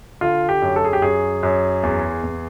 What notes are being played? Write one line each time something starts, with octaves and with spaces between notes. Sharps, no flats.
D3 F4
G4
F#2
A4
G#4
G4
F#2 G#4
F#2
E2
E2